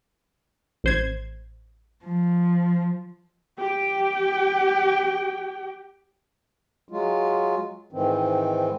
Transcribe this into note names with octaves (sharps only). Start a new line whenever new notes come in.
A1 C5 G#6
F3
G4 G5
F#3 G#3 F4
G#2 D#3 E3 C4